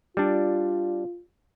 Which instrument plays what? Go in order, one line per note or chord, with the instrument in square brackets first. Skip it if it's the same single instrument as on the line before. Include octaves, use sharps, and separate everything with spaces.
[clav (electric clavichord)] G3 D4 [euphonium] F4